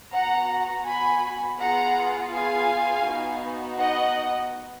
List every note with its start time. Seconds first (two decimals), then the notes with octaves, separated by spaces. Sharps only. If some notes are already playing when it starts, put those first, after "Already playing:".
0.12 B3 F#4 F#5 A#5
0.85 G#5 B5
1.59 B3 F4 G#4 F#5 A#5
2.33 F5 G#5
3.06 B3 D#4 F#4
3.79 D#5 F#5